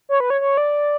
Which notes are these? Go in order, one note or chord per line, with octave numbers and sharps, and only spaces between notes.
C#5
B4
C#5
C#5
D5